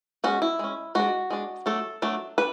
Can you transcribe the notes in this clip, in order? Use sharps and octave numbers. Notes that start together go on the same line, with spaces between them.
G#3 C#4 F#4
E4
G#3 C#4
G#3 D4 F#4
G#3 D4
F#3 A3 D4 A4
F#3 A3 D4
D4 B4